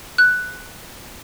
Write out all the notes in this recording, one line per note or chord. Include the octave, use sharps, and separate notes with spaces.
F#6